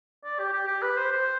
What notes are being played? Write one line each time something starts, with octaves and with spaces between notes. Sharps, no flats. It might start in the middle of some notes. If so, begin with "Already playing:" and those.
D5
G4
G4
G4
B4
C5
C5